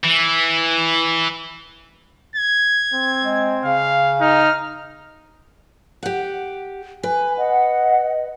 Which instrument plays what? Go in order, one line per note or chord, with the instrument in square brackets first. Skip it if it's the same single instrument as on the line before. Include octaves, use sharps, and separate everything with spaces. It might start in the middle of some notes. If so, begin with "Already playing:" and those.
[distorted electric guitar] E3
[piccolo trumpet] G#6
[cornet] C4
[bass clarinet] G#3
[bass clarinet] C#3 [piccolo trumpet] F5
[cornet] D#4 [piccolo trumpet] F6
[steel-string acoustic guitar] G4 F#5
[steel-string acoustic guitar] B4 [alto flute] G#5
[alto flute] D#5 [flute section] F#5